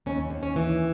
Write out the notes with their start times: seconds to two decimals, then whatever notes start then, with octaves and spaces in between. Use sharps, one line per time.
0.06 D#2 C#4
0.30 D#2
0.43 C#4
0.56 E3